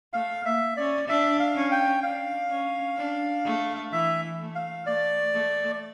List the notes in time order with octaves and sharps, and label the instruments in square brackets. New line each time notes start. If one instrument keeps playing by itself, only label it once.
[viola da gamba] A3 [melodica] F5
[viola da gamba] A#3 [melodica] E5
[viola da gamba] C#4 [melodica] D5
[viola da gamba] D4 [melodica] E5
[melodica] F5
[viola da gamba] C#4
[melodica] G5
[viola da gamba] D4 [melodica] F5
[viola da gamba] C#4
D4
A3
[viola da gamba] E3 [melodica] E5
[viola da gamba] A3
[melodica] F5
[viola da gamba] A3 [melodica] D5
[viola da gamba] A3